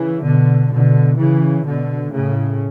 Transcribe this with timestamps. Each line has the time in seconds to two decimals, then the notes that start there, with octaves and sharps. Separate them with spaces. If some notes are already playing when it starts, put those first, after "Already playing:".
Already playing: C#3 E3
0.23 B2 D3
0.70 B2 D3
1.17 C#3 E3
1.64 B2 D3
2.11 A2 C#3